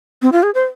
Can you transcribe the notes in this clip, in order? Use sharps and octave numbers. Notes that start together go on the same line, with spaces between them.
C4
F4
G#4
C5